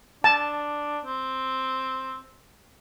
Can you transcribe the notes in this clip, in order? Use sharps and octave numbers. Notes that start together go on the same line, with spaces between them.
D4 A5
C4